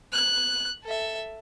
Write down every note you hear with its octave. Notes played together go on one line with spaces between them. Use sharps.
F#6
A4 E5